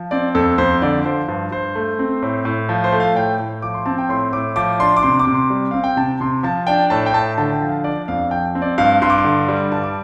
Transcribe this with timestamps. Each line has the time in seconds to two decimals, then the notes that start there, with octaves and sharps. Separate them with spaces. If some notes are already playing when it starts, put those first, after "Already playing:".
Already playing: F3
0.11 C4 D5
0.35 F2 A4
0.58 F2 C5
0.82 D3 D5
1.05 F3 C5
1.28 G2 C5
1.51 G2 C5
1.75 A3
1.99 C4
2.22 A2
2.45 A2
2.69 F3
2.84 C5
2.92 A3
3.00 F5
3.16 A2 G5
3.39 A2
3.62 F3 D6
3.74 C6
3.86 C4 A5
3.98 G5
4.09 A2 C6
4.33 A2 D6
4.56 F3 D6
4.79 D4 C6
4.97 D6
5.03 C3 C6
5.19 D6
5.27 C3
5.34 C6
5.50 G3
5.71 C4 F5
5.84 G5
5.97 C3 A5
6.20 C3 C6
6.43 F3 A5
6.67 D4 G5
6.90 A2 A5
7.06 G5
7.13 A2 A5
7.38 D3 A5
7.53 G5
7.61 F3
7.69 F5
7.84 D4 D5
8.08 F2 F5
8.31 F3 G5
8.55 C4
8.62 D5
8.78 G2 F5
9.02 G2 C6
9.10 D6
9.18 C6
9.24 D3
9.48 G3
9.72 G2 A5
9.84 D6